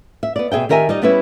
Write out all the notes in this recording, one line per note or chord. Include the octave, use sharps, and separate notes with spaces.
E5
B3 D5
B2 G#4 E5 G5
D#3 G4 A#4 E5 G#5
G3 D#4 D5 D#5
G3 B3 C#4 E4 B4 E5